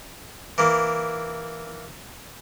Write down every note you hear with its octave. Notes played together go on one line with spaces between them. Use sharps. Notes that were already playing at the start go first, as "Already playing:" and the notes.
E3 A#3